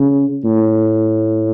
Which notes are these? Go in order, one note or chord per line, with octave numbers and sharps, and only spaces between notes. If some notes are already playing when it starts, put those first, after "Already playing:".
Already playing: C#3
A2